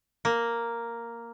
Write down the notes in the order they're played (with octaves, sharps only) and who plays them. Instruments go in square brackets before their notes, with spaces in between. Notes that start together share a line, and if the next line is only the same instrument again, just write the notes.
[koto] A#3